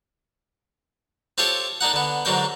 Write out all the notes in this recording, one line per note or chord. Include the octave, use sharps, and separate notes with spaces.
C4 F4 G4 A4 C#5
A#3 D4 D#4 F#5
D3 B3
G#2 D3 F#3 A#3 G5